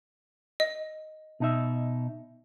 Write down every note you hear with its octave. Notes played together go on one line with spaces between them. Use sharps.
D#5
B2 D#4 E5